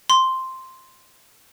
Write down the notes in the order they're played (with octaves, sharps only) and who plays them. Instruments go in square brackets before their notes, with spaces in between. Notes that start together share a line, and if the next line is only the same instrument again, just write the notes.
[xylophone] C6